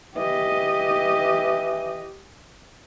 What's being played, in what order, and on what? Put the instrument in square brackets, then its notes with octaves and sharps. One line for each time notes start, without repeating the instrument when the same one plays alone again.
[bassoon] E3 [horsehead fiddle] G4 D#5